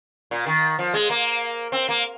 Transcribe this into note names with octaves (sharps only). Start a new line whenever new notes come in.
A#2
D#3
F3
G#3
A#3
C4
A#3